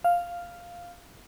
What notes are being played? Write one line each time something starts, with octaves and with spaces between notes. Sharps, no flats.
F5